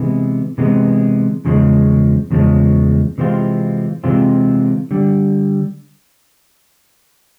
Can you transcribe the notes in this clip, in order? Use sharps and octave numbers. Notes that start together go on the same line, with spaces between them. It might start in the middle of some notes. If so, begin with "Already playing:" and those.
Already playing: C3 E3 G#3 B3
C3 E3 G#3 B3
E2 C#3 F3 G#3
E2 C#3 F3 G#3
C3 E3 G#3 C4 F4
C3 E3 G#3 C4 F4
D3 G3